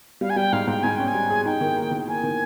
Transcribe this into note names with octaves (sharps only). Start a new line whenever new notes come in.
G3 F5
G#5
G3 G5
G#2 F5
G#2 G5
G#2 G#5
C#4 G5
G#5
G3
G#4
D#4 G5
D#3
A#3
D#3
A#3 G#5
D#3